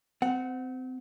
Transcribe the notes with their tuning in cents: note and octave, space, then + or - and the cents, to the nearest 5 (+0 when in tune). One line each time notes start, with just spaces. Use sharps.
C4 -25 F#5 +0